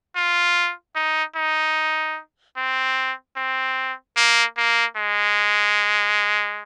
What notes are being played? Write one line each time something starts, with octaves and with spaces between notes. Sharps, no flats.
F4
D#4
D#4
C4
C4
A#3
A#3
G#3